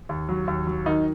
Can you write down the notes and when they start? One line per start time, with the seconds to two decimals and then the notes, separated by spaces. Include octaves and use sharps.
0.09 D#2
0.29 F#3
0.47 D#2
0.67 F#3
0.86 D#3 D#4